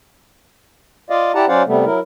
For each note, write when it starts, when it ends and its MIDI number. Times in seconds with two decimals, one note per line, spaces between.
1.10 1.32 65
1.10 1.32 74
1.10 1.32 75
1.10 1.32 77
1.35 1.45 64
1.35 1.45 67
1.35 1.45 74
1.35 1.45 78
1.35 1.45 81
1.35 1.45 82
1.48 1.62 54
1.48 1.62 61
1.48 1.62 72
1.48 1.62 74
1.48 1.62 77
1.48 1.62 78
1.67 1.85 48
1.67 1.85 55
1.67 1.85 57
1.67 1.85 59
1.85 1.99 54
1.85 1.99 64
1.85 1.99 70